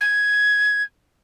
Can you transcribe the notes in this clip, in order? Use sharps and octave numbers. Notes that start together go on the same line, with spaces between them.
G#6